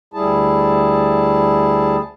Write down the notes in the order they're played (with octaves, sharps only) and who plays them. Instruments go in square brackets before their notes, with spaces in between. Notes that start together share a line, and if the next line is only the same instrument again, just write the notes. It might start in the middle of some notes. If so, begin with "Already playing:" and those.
[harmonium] D2 G3 E4 G#4 A5